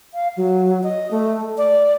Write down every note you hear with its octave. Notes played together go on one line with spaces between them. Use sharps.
F5
F#3
D#5
A3
D5